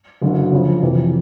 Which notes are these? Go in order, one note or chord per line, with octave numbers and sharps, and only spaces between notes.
F#1 F#2 D3
D2 C#3 F3
F2 C3 E3